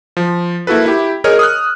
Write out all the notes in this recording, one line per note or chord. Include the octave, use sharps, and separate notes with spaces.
F3
A#3 E4 F#4 A4 B4
E4 G4
G#4 A#4 C#5 D#5 F6
D#6 F6 F#6